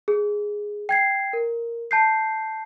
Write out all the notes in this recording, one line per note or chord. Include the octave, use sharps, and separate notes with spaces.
G#4
G5 G#6 C7
A#4
A5 G6 C7